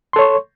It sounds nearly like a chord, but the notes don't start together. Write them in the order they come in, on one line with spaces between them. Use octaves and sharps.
C6 A4 C#5 C#6